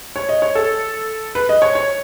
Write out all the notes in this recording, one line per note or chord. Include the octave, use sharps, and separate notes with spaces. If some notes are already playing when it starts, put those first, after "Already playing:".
C#5
D#5
C#5
A4
B4
D#5
C#5
C#5